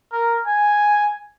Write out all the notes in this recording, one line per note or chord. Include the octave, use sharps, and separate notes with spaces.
A#4
G#5